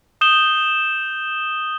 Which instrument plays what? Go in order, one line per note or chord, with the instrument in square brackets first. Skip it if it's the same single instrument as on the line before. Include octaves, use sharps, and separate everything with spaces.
[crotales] D#6 G6 E7 G7